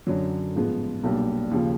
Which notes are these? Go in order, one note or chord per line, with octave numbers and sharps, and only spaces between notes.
F#2 D3 F#3
A1 G#2 F3 G#3 B3
B1 A#2 G3 A#3 D4
D#2 C#3 F3